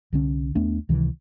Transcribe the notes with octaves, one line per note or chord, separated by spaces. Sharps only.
C2 D3 C#4
D#2 A3 B3 D4
C#2 C3 D#3 E3